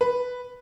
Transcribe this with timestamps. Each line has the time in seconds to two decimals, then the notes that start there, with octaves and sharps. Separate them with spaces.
0.01 B4